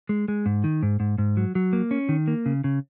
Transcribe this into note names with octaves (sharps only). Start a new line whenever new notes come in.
G#3
G#3
G#2
D#3
G#2
G#2
G#2
F#3
F#3
A#3
C#4
D#3
A#3
C#3
C#3